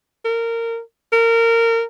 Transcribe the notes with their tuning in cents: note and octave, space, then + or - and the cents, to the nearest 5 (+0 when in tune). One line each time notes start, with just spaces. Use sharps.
A#4 -20
A#4 -20